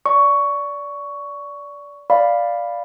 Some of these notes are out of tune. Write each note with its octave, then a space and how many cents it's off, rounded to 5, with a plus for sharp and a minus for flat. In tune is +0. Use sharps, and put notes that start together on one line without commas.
D5 -20 C#6 +10
D5 +0 F5 +0 B5 +0